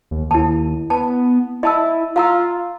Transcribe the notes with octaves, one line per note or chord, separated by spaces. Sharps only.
D#2
D#2 E4 A5
B3 A5
E4 D#5 A5 E6
F4 F5 A#5 E6